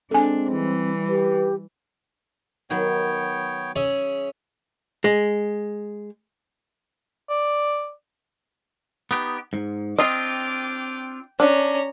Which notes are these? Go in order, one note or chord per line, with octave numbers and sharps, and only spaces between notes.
G#3 C4 D4 A4 G#5
E3 G3
G4 B4
D#3 F#3 B3 C#5 G5
C#4 G#4 E5
G#3
D5
B3 D#4 G4
G#2
C4 D4 F4 D#5 G5 D6
C#4 D4 A#5